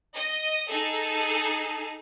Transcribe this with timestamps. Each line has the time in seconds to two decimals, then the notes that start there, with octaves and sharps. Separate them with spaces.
0.15 D#5
0.69 D#4 G#4 A4